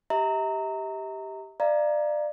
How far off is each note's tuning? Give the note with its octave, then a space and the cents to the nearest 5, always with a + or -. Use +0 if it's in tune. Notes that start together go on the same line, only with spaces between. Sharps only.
G4 +0 E5 -45 A#5 -20
D5 +25 F5 -30 A#5 +0